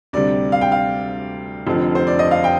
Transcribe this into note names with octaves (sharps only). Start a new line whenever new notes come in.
D2 C3 G3 D5
F5
G5
F5
F1 F2 D3 F3
C5
D5
D#5
F5
G5